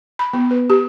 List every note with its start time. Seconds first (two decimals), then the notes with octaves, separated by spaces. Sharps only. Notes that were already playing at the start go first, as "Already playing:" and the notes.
0.19 B5
0.33 B3
0.51 B4
0.70 G4